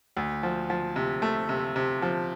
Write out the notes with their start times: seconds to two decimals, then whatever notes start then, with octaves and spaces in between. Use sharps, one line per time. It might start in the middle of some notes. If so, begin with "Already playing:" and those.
0.17 D2
0.43 F3
0.70 F3
0.96 C3
1.22 A3
1.49 C3
1.76 C3
2.02 F3